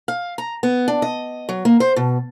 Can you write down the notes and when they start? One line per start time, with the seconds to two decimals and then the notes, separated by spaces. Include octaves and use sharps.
0.08 F5
0.38 A#5
0.63 B3
0.88 D4
1.02 D#5
1.49 F#3
1.65 A#3
1.80 C5
1.96 B2